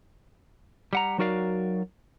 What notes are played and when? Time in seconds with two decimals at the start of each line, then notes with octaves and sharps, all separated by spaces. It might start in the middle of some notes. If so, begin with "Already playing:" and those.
0.93 G3 F#5 A#5
1.18 F#3 D#4 F#4 A#4 D5 F5